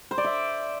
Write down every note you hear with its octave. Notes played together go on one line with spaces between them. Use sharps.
C5
D5
E5